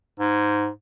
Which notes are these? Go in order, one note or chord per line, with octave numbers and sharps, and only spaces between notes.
G#2